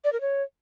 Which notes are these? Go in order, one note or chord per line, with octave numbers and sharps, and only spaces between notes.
D5
A#4
C#5